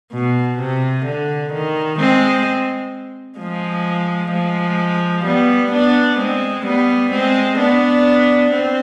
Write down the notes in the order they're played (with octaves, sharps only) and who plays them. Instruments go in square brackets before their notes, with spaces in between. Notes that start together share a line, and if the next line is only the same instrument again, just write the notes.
[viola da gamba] B2
C3
D3
D#3
G#3 C4
F3 G#3
F3 G#3
G3 B3
B3 D4
G#3 C4
G3 B3
G#3 C4
B3 D4
C4